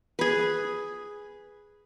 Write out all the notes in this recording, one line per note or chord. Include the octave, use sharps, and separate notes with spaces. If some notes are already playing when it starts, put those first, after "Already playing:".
G#4 B4